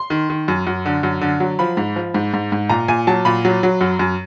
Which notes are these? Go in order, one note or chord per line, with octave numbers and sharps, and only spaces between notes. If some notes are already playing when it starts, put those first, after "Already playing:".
Already playing: C6
D#3
D#3
F#2
F#2
D3
F#2
D3
F#3
F3 B5
G#2
F3
G#2
G#2
G#2
A#2 A#5
A#2 G#5
F#3 A5
A#2 B5
F#3
F#3
F#2
F#2